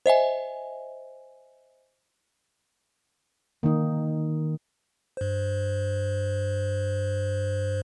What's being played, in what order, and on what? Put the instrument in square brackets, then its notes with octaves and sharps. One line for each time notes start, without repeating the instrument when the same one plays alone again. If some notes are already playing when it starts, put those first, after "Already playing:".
[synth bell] C5 D#5 E5 G#5
[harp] D#3 [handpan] A#3 D#4
[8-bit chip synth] G2 C5